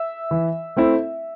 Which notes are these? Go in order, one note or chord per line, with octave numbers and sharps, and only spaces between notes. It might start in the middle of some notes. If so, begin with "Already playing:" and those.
Already playing: E5
E3
A3 C4 E4